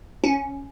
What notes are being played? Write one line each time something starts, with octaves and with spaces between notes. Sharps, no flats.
C#4